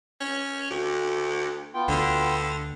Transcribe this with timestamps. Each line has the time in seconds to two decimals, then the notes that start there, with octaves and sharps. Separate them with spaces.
0.21 C#4
0.70 D2
1.74 B3 F4 G5
1.88 D2 D3